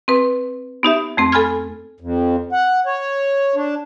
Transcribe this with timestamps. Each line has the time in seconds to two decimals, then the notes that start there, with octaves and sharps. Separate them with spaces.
0.08 C4 B4
0.83 B3 D#4 G4 E5
1.17 F2 A3 C4
1.32 A4 G#5 B5 F6 G#6
2.00 F2
2.52 F#5
2.86 C#5
3.55 D4